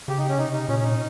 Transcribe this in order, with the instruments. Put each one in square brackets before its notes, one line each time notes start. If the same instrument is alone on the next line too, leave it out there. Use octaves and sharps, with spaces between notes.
[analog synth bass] C#3 [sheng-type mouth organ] G4
[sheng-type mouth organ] D#4
C#4
[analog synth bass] C3 [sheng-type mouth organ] D#4
[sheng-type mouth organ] D#4
[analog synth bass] A#2 [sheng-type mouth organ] C#4
[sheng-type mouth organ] C#4
D#4